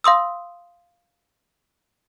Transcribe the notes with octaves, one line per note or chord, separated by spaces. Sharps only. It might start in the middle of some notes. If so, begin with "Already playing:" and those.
F5 C6 D#6 E6